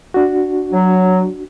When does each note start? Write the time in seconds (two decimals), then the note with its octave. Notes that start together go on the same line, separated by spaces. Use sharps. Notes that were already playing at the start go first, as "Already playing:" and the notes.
0.14 D4 F#4
0.72 F#3